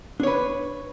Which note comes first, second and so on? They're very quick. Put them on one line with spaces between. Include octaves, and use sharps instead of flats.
D4 C#5 B4